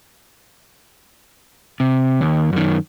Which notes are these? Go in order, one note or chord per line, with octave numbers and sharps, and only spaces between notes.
C3
D#2
F#2 D#3